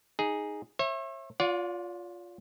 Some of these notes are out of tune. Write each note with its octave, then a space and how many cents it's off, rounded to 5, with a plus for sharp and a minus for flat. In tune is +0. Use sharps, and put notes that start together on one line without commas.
D#4 +0 G#4 +0
C#5 -40 E5 +5
F4 +10 D5 -40 F#5 -45